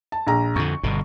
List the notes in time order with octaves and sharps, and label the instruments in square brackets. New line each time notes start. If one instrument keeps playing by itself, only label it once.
[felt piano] A5
A#1 A#5
[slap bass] F2 D3 [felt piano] C#6
[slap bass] G1 B2 D3